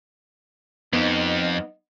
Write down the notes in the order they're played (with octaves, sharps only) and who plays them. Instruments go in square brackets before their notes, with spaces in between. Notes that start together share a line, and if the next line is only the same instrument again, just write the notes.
[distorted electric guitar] F2 [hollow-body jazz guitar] B3 D#4